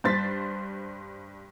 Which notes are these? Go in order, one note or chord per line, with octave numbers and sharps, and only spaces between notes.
G2 C5 A6 B6